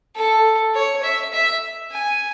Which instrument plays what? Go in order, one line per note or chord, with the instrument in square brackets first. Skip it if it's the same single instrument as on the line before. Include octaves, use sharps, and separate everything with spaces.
[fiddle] A4
C#5
E5
E5
G#5